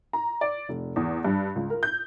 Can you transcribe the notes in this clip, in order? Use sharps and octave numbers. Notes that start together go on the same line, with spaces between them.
A#5
D5
F1
E2
G2
C#2
A#4
G6